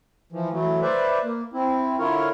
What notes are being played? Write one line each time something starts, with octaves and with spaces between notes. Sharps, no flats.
E3 F3
E3 F#3 A3
B4 C5 D5 E5
A#3
C4 E4
D3 E4 F4 A#4 C#5